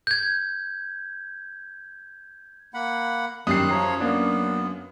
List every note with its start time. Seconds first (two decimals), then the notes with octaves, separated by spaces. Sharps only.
0.07 G6 G#6
2.74 A#3 F#5 B5
3.47 F#2 D#3 G3 D#6 F#6 C7
3.71 F3 C#5 A#5
4.00 A#3 B3 D4